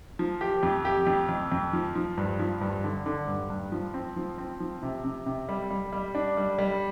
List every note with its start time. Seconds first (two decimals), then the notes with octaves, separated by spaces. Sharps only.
0.19 F3
0.41 G4
0.63 F2
0.85 G4
1.07 F2
1.29 F2
1.52 F2
1.73 F3
1.96 F3
2.17 G2
2.39 F3
2.61 G2
2.84 D3
3.06 D3
3.28 G2
3.50 G2
3.72 F3
3.94 C4
4.16 F3
4.38 C4
4.60 F3
4.83 C3
5.04 C3
5.26 C3
5.49 G3
5.70 G3
5.93 G3
6.15 D4
6.37 G3
6.59 G3